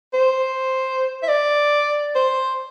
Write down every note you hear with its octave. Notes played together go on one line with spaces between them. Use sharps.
C5
E5
D5
C5